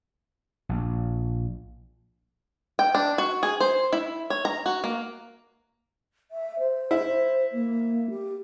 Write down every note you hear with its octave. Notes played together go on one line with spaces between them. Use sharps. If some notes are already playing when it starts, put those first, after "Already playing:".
A#1
G5
D4
F#4
G#4
C5
E4
C#5
A#5
F#4
A#3
E5
C5
E4
A#3
G4